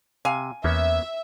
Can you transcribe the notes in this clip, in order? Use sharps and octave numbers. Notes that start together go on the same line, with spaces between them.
C3 F5 G#5
E2 A#3 B3 C#4 E5